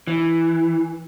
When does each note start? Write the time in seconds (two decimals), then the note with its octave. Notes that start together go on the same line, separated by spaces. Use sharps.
0.07 E3